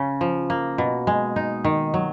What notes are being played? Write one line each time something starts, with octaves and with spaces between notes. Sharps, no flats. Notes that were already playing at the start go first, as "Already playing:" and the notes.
Already playing: C#3 C#4
F3
A#3
B2
G#3
D#4
D#3
F#3